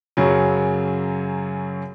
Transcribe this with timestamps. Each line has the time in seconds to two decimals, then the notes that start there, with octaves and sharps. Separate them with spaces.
0.17 F#2 C#3 F#3